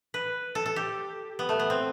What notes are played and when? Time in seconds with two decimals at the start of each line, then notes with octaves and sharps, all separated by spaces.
0.14 B4
0.55 A4
0.66 A4
0.76 G4
1.39 B3
1.49 A3
1.59 B3
1.70 C4